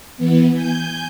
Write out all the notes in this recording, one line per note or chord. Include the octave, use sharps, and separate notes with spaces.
E3 B3
G#5 G6